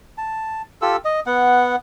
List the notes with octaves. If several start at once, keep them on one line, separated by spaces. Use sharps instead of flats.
A5
F4 G4 A4 E6
D#5
B3 F#5